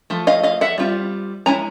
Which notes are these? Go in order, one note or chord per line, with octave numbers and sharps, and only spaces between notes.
F3 A3
D#5 F5
D#5 F5
E5 F#5
G3 C4 F4
G#3 C#4 E4 G#5 A#5